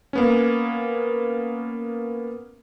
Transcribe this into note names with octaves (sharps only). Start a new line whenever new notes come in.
A#3 B3 C#4